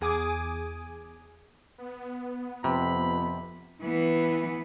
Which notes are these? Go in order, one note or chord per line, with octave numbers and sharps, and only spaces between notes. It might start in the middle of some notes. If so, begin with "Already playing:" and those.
E2 G#4 G#5 D6 D#6
B3
F2 C3 B5
E3 B3